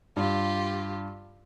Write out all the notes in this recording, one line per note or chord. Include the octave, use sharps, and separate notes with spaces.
G2 F4 G4